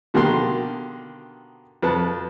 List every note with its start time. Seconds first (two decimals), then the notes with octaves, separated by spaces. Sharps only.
0.14 B2 D3 D#3 A#3 G4 C6
1.82 F2 B4 A5